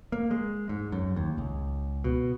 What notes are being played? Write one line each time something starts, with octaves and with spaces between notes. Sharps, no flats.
A#3
G#3
G#2
F#2
D#2
C#2
B2